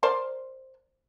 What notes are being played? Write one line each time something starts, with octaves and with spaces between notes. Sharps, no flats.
A#4 C5 D5